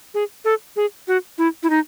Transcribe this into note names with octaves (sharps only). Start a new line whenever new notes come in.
G#4
A4
G#4
F#4
E4
E4
D#4